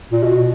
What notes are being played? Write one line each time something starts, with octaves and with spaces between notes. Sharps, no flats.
A#2
B2